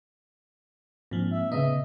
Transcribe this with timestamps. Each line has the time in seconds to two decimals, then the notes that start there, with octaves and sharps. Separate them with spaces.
1.11 G#2 F3 A#3 C4 D4
1.32 E5
1.52 A2 C#3 B3 D#5 E5